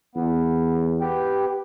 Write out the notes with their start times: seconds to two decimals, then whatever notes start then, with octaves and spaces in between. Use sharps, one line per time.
0.15 E2 B3
1.00 B3 G4